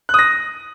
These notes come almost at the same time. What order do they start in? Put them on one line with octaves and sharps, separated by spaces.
F#6 D#6 A#6